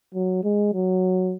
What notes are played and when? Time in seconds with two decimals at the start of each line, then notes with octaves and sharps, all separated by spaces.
0.14 F#3
0.44 G#3
0.74 F#3